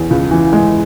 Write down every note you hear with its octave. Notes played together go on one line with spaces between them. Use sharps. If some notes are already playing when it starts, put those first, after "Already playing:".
Already playing: E2
C#2
E3
G#3